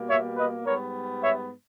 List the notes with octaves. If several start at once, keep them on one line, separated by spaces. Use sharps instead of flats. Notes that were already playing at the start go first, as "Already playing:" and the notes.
Already playing: B2 G3 A#3
C#5 E5
B4 D#5
G#2 G3 B3 A#4 C#5
C#5 E5